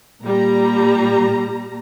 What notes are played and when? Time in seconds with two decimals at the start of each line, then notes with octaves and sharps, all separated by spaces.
0.24 A#2 G3 A#5